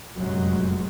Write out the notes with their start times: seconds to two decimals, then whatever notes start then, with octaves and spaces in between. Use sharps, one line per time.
0.15 F1 F#2 A#2 F#3 G#3